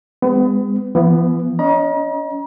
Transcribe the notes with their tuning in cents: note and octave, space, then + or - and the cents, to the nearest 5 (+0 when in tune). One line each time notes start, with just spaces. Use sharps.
G#3 -30 B3 +35
E3 +45 B3 +0
C#4 +30 D#5 +0 A#5 +40